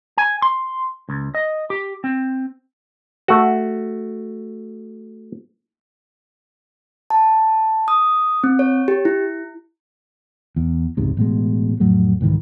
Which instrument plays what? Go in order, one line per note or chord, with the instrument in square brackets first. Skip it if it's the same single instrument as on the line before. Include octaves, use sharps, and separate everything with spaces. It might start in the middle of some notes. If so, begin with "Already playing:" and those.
[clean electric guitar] G#5
C6
C#2
D#5
G4
C4
[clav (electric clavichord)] A3 F#4
[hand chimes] A5
D#6
C4
C#5
G4
E4
[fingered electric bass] E2
F1 C#2 G#2 C3
A1 B2 G#3
F2 A2 F#3 A3
C2 G#2 D#3 E3